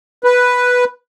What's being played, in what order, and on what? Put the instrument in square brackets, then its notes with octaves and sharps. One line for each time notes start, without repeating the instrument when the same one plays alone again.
[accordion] B4